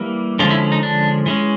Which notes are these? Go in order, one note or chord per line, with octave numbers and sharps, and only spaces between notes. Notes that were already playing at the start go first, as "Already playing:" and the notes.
Already playing: E3 G3 A#3
D3 F3 G#3 C#4 F4
E4
D#4
D4
E3 G#3 C#4